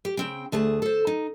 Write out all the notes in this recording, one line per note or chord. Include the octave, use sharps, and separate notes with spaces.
G4
C#3 C4 G5
D2 A3 G#4 A5
A4 C5
D#4